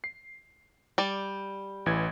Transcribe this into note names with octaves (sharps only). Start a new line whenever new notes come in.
C7
G3 D5
A1 E3 G#6